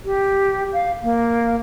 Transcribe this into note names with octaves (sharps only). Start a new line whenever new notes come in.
G4
F5
A#3